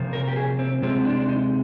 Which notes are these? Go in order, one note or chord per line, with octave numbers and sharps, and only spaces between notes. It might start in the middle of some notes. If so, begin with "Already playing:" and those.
Already playing: C3 F3 A#3
A#4
G4
G#4
C4
C3 F3 G#3 C4
D4
D4
D#4